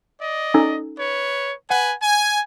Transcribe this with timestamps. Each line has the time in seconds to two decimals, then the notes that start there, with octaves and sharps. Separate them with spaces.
0.21 D5 D#5
0.54 C#4 D#4 A4
0.98 B4 C#5
1.70 B4 F#5 G#5
2.03 G#5